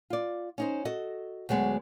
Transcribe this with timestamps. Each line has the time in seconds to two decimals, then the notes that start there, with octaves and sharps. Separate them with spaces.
0.10 F4 D5
0.58 C#4 D#4 C5
0.85 F#4 A4 D#5
1.49 D2 F#3 G#3 B3